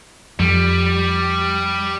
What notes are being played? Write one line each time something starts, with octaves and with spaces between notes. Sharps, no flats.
F2 G3